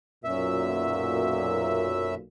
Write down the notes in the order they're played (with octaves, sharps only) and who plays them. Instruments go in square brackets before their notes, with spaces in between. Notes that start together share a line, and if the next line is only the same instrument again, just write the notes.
[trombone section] B1 A#2 [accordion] F#2 E5